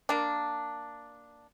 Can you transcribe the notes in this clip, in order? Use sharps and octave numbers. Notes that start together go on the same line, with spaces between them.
A#3 D4